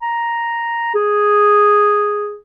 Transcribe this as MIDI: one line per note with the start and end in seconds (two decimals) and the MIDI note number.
0.02 0.94 82
0.95 2.39 68